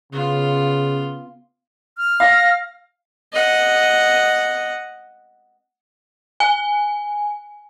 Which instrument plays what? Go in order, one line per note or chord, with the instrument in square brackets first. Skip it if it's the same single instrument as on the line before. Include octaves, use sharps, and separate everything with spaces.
[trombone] C#3 [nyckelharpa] B3 F4
[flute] F6
[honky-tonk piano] F5 [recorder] A#6
[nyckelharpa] D#5 F#5
[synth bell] G#5